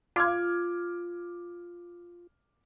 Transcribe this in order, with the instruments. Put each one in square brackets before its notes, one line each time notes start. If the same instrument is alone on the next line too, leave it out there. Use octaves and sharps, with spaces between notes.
[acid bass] F4 [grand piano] D6 F6 G#6